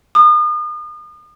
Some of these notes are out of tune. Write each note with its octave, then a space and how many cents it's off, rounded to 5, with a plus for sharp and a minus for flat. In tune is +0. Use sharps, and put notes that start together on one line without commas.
D#6 -40